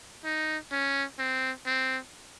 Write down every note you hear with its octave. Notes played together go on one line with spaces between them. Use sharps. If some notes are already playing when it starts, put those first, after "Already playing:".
D#4
C#4
C4
C4